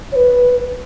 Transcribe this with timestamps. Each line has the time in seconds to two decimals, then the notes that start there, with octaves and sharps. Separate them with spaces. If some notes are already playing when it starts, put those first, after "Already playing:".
0.12 C#5
0.16 B4